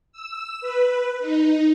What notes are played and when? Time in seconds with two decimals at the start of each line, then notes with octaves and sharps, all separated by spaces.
0.12 E6
0.61 B4
1.20 D#4